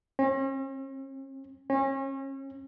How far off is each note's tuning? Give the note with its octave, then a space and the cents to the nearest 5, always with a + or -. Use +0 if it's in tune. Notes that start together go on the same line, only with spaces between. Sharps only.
C#4 -45
C#4 -35